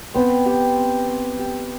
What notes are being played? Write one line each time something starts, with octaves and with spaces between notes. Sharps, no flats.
B3 C4
G4
C4
C4
G4